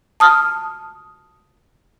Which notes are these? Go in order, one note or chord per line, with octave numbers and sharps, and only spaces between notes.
A5 D#6 F6